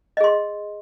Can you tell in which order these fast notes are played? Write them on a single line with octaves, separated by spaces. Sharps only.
D#5 G#4 C6